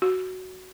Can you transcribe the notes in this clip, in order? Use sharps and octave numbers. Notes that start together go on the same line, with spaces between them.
F#4